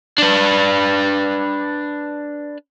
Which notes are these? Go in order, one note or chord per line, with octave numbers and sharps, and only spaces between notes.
D4 B4